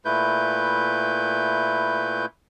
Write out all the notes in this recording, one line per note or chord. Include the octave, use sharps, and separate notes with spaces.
A#2 A3 E4 B4 G6